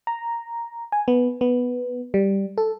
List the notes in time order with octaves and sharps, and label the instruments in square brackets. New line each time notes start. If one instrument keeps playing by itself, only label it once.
[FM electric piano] A#5
G#5
B3
B3
G3
A4